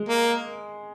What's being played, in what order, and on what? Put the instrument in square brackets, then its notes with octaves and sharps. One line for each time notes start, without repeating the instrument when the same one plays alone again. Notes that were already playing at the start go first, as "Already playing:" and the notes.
Already playing: [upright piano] G#3
[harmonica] A#3